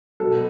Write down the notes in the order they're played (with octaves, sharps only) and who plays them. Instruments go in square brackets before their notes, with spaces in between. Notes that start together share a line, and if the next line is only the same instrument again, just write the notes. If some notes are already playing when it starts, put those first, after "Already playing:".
[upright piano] B2 F#3 A4